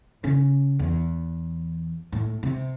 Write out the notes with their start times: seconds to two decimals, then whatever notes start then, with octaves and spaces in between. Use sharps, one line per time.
0.24 C#3
0.79 E2
2.12 A2
2.43 C3